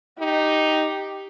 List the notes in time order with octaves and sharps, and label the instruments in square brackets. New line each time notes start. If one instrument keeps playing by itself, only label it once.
[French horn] D#4 [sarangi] G4